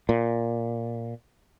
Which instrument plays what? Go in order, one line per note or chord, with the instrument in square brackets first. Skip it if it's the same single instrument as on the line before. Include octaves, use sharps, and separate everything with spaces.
[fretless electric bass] A#2